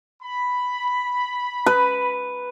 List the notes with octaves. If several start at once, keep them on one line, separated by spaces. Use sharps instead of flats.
B5
B4